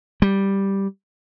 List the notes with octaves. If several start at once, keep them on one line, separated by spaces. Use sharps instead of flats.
G3